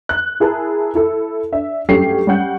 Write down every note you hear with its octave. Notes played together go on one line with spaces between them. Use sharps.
F#6
E4 G#4 A#4 A5
E4 A4
D4 E5
G2 F#3 A3 C#4 G4 C7
G3 C#4 F#5 G6